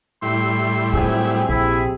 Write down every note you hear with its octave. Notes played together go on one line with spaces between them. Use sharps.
A2 G3 E4 C6
F#3 C4 F4 G#4
A#1 C3 E4 G#4